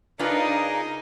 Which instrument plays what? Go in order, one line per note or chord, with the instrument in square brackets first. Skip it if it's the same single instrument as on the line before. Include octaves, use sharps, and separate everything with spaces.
[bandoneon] C#3 G#4 A#4 [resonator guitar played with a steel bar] D4 F4 B4 [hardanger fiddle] D#4